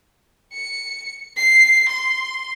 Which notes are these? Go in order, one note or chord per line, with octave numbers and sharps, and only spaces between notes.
C#7
C7
C6